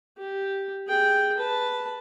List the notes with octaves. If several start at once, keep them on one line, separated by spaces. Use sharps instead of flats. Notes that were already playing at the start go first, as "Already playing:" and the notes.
G4
G#4 G5
B4 A5